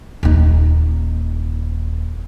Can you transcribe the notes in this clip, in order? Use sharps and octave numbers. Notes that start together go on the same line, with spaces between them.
D#1 D#4